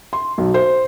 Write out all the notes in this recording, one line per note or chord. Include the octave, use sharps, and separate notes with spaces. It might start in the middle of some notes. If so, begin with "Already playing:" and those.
C6
B1
C5